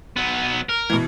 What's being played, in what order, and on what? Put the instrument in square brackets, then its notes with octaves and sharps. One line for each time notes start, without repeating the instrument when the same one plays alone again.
[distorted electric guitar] F#3 B3
A#4
[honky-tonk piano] B2 E3